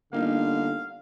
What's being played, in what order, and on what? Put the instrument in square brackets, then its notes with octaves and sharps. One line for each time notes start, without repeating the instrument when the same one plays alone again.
[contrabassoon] G1 [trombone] D3 [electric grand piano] A#3 D#4 [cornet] F5